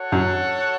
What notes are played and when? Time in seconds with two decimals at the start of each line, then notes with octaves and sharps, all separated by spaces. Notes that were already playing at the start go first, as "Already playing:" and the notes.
Already playing: F#4 A4 C#5 F#5
0.12 F#2